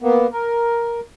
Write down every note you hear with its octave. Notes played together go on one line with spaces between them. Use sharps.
A#3 B3
A#4